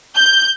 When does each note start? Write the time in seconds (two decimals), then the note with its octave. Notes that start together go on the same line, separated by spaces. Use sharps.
0.16 G6